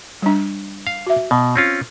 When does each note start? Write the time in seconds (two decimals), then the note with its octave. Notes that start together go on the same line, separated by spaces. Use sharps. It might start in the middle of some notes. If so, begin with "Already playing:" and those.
0.22 G3 D4
0.87 F5
1.07 F#4 E5
1.31 B2
1.56 C4 C#4 F4